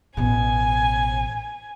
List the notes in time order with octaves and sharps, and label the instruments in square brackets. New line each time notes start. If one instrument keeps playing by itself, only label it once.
[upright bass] A1 B2 [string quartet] G#5